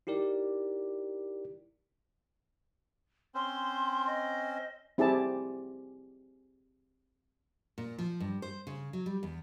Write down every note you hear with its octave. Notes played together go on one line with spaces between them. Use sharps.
D#4 E4 G4 A#4 D5
C4 C#4 C5 C6
D#5
C4 E4 G4 G#4 D5 A5
A#2
F3
G2
C5
C#3
F#3
G3
E2